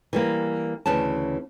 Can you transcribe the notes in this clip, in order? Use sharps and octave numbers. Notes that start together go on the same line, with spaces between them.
E3 G3 A#3
D2 C#3 E3 C#4 A5